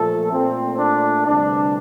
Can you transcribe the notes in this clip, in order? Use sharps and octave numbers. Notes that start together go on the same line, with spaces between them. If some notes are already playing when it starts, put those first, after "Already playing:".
Already playing: A#2 F3 A3 A4
A#2 A3 C4
D4
D2 C3 E3 G3 D4